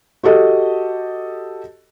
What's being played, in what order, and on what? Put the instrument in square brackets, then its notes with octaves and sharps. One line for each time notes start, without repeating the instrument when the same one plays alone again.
[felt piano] F#4 G4 A4 D#5